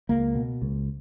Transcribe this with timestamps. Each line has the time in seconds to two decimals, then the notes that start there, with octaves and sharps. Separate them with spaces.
0.09 C#2 A#3
0.35 B2
0.62 C#2